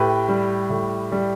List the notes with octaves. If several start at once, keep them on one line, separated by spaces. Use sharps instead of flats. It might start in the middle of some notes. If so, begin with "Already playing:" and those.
Already playing: A2 G4 B4
G3
A2
G3